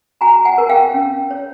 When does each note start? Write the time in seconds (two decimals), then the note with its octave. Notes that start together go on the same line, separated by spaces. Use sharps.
0.21 F#4 G#5 A#5
0.45 F#5 G#5
0.58 A#4
0.70 F5 G5
0.94 C#4
1.31 C#5